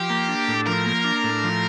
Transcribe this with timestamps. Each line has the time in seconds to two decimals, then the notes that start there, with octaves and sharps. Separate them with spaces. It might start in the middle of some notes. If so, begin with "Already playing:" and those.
Already playing: F3 G4
0.10 A#3
0.28 D4
0.48 A2
0.67 F3 A#4
0.86 A#3
1.04 D4
1.24 A2
1.44 F3